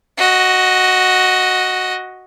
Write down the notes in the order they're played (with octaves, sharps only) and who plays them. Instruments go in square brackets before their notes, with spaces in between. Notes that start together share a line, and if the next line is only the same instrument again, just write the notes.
[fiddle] F#4 D#5